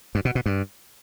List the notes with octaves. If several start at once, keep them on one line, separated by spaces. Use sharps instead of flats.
G2
B2
B2
G2